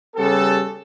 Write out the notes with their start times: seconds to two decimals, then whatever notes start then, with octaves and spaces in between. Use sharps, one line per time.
0.16 C#3 G3 B3 G4 A4